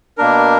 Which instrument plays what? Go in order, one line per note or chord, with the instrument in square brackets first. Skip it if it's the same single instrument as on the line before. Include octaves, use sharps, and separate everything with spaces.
[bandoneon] B2 A#3 D4 A#4